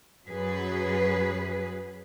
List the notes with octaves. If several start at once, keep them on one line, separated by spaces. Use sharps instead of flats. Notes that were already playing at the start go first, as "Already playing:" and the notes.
F#2 F#3 G#4 B4